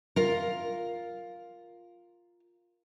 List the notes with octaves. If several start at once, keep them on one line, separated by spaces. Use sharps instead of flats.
F4 A#4